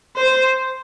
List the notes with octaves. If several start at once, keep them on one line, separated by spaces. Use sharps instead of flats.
C5